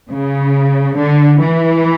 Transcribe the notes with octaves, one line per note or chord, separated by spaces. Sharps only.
C#3
D3
E3